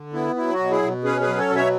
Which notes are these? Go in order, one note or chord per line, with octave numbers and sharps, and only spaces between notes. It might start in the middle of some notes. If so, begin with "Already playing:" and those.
Already playing: D3
B3 E4
F#3 E4
F#4
B2
E4 G#4
B2
C#4 G#4 B4
G#4 B4
F#3
A4 C#5
B2
C#5 E5